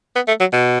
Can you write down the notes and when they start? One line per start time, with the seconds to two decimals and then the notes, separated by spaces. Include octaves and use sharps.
0.16 B3
0.28 A3
0.40 F#3
0.53 B2